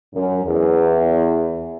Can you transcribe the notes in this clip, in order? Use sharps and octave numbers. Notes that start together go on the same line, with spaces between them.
F#2
E2